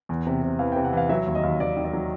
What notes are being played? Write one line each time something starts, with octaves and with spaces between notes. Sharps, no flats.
E2
C3
C3
E3 F5
C3 G5
F#5
E3 F5
F#3 E5
D#2
D#5
D#2
D#2 D5
D#3
D5
F#3